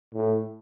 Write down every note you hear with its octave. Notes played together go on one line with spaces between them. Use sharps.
A2